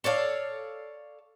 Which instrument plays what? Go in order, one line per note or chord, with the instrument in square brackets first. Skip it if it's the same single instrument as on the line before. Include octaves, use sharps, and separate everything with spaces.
[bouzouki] A4 C#5 D5 F5